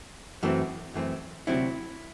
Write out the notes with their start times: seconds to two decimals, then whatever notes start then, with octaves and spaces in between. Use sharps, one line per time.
0.43 F#2 E3 A3 C4
0.94 F#2 E3 A3 C4
1.47 D2 C3 F#3 C4 E4